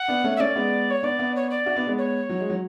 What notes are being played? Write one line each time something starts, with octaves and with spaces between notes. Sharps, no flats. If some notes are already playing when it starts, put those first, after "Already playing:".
Already playing: F#5
B3 D4
A3 C#4
E5
A3 C#4 D5
G#3 B3
C#5
B3 D4 D5
B3 D4
C#5
D5
D4 F#4
B3 D4
G#3 B3
C#5
F#3
G#3
F#3